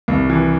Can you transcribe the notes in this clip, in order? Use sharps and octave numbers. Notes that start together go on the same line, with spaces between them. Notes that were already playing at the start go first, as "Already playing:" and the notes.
C2
E3